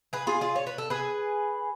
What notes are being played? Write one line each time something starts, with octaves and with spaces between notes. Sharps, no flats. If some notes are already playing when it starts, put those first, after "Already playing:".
G#4 B4
F4 G#4
F4 G#4
C#5
B4
A4
G#4 B4